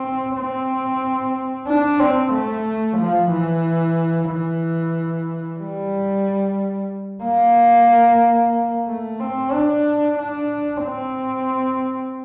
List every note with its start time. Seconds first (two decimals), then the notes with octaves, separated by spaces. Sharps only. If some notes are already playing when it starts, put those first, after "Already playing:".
Already playing: C4
0.36 C4
1.67 D4
2.00 C4
2.33 A3
2.98 F3
3.31 E3
4.29 E3
5.60 G3
7.24 A#3
8.87 A3
9.20 C4
9.53 D4
10.18 D4
10.84 C4